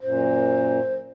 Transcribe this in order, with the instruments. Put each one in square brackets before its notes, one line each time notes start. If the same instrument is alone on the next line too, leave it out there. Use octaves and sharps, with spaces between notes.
[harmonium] F#2 A#2 [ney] C5